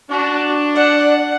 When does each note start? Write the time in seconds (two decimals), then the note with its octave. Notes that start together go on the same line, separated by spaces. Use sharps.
0.10 D4 F#4
0.76 D5 F#5